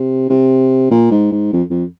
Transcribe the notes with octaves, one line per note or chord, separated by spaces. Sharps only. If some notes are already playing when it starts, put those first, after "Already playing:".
Already playing: C3
C3
A#2
G#2
G#2
F2
F2